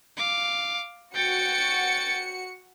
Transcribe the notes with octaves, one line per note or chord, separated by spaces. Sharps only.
F5 D6
F#4 G5 A6 C#7